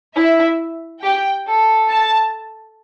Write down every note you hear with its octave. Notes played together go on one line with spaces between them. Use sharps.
E4 E5
G4 G5
A4
A5